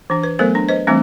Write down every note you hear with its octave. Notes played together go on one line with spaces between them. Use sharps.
E3 D4
B4
F#3 A3 B3 A4 A#4 C5
D4
B4 C5 D#5
E3 G3 A3 C4 D4